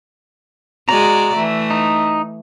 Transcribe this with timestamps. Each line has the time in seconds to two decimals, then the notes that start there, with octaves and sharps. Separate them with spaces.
0.89 G#3 F#4 D5 A#5
1.35 E3 A3
1.70 D#4